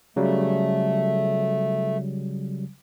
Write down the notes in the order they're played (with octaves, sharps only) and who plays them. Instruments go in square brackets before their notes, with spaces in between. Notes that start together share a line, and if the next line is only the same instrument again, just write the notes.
[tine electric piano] C#3 F#3 G3 [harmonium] A3